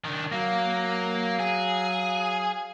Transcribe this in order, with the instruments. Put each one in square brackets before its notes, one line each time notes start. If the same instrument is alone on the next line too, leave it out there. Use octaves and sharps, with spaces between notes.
[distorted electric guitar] D#3 D4
[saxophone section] F#3 F5 [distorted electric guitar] A#3
[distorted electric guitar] G#4